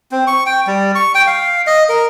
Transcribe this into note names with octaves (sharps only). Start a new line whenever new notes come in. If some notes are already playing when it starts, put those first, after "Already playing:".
C4
C#6
G5
G3
C#6
G5
F5
D#5
A#4